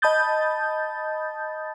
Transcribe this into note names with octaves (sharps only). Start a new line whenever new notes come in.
D#5 A5 B5 D#6 G6 A6